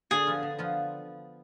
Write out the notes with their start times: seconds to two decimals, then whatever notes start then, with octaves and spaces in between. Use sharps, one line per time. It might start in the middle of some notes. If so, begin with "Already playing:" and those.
0.11 D3 G#4
0.27 F3 B3 F4
0.43 D3
0.58 F3 B3 F4